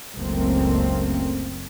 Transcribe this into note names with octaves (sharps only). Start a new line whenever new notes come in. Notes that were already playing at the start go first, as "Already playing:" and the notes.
F#1 C#2 A3 A#3 C4